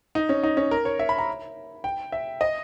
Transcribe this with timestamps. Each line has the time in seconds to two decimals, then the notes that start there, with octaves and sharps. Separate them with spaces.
0.15 D#4
0.29 C#4
0.43 D#4
0.57 C#4
0.71 A#4
0.85 C#5
0.99 E5
1.09 B5
1.18 A#5
1.84 G5
2.12 E5
2.41 D#5